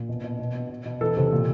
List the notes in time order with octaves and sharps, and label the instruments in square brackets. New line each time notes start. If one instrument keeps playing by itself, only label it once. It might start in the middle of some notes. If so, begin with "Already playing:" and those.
Already playing: [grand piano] A#2
B2
B2
B2
B2
B2
B2
E3 A4
C3
A#2